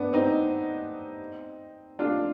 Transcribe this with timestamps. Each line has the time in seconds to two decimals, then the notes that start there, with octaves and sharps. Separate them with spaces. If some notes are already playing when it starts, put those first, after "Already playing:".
Already playing: B3 D4
0.13 C4 D#4
1.99 D4 F4